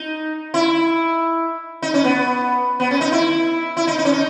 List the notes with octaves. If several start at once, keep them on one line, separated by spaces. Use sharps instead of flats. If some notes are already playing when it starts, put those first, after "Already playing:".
Already playing: D#4
E4
D#4
C#4
B3
B3
C#4
D#4
E4
E4
D#4
D#4
C#4
D#4